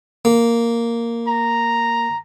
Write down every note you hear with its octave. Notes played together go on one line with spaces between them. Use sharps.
A#3
A#5